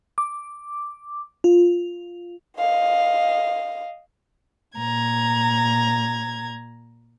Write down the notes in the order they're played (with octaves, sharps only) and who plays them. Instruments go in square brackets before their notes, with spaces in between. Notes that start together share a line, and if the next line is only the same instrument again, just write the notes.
[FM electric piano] D6
F4
[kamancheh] D#5 F5
[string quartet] A#2 A#5 G#6